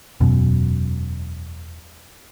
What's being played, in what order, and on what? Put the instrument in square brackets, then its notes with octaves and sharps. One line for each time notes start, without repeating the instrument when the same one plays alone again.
[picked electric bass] E1 F#2 B2